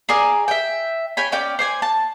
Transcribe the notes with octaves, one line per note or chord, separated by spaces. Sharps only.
G#4 A#4 D5 G#5
E5 G5
C#5 G5 G#5 B5
C#4 D5 G5
C5 D5 G#5
A5